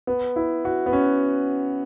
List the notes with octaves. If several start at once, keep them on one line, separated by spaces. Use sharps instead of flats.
B3
E4
F#4
B3
C#4